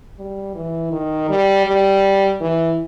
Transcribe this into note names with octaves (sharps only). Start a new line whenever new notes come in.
G3
E3
D#3
G3
G3
E3